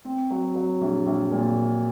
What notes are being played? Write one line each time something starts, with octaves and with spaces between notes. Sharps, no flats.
C4
F#3
F#3
A#1
A#1
A#2